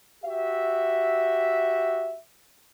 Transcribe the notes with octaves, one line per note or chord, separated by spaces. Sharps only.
F#4 G4 E5